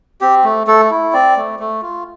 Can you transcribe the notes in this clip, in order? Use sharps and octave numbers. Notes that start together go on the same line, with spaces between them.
C4 G4
A3
A3 A4
E4
C4 D5
A3
A3
F4